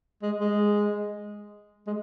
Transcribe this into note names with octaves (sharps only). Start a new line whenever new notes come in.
G#3
G#3
G#3